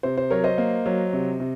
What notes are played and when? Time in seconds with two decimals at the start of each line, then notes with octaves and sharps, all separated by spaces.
0.03 C3 C5
0.18 C5
0.30 F#3 A#4 C#5
0.44 C5 D#5
0.58 A#3
0.86 F#3
1.13 C3
1.40 C3